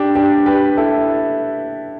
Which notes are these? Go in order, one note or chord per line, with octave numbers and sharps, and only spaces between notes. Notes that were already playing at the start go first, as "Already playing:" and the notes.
Already playing: D4 G4
D4 G4
G4 B4
E4 A4